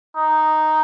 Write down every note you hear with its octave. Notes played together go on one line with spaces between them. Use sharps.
D#4